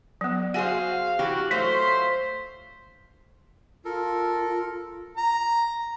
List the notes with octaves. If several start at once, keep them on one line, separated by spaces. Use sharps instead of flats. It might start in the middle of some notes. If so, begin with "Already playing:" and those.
F#3 B3
F#4 G#4 C5 F5 F#5 G#5
E3 F#4 G4
F#3 A3 F4 C5 B6
F4 A4 A#4
A#5